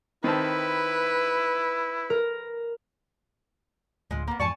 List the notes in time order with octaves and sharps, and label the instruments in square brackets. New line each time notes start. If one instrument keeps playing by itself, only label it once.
[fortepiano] D#3 C4 A5 [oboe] E4 [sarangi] B4
[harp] A#4
[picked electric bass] D1 D2 [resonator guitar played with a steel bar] G#3 F4
[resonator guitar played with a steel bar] A#3 B3
[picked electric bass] F2 G#2 E3 [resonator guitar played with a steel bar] D5 G#5 A5 [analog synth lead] C#6